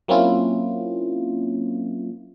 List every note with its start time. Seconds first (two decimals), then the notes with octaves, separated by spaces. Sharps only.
0.08 F#3 A#3 C4 C#4 E4 F4